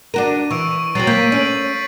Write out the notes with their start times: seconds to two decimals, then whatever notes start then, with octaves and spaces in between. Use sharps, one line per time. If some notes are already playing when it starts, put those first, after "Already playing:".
0.14 D4 F#4 A#4 D#7
0.51 E3 C#6 E6 D7
0.95 F#3 C4 A6 C7 F#7
1.07 A#3 G6 B6 D#7
1.32 C#4 D7 D#7 F#7